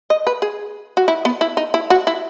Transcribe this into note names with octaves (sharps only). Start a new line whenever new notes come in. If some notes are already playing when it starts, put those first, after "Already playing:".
D#5
B4
G#4
F#4
E4
B3
E4
D#4
E4
F#4
E4